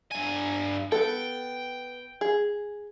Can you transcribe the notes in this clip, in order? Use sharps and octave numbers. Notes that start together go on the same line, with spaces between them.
G2 G#5
B3 A4 G5
G#4